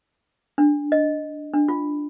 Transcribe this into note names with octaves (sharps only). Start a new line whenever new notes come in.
D4
D#5
D4
F4